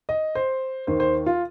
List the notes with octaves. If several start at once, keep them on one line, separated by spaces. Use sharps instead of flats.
D#5
C5
D#2 D#3 C5
C5
F4